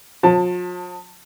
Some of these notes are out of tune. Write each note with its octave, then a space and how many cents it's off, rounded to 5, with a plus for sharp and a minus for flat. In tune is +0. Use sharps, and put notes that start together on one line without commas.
F3 +45 A5 +15